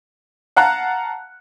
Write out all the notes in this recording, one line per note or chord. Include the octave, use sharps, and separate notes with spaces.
F5 F#5 A5 A#5 F#6